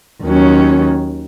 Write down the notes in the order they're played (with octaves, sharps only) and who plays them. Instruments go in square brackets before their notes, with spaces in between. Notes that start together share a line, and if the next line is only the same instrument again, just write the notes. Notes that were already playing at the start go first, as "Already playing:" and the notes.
[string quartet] D#2 D#3 F#3 C#4